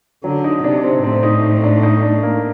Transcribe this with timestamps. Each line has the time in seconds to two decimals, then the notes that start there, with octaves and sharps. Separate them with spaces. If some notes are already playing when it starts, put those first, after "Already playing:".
0.24 D3 F#3
0.44 D#4
0.64 C3 D4
0.84 C4
1.03 A2 C4
1.23 D#4
1.63 D4
1.83 D#4
2.03 D4
2.23 A#3